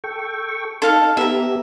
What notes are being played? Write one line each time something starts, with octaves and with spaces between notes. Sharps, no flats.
A4 G5 C#6
D#4 A4 F5 A5
B3 G4 E5 A#5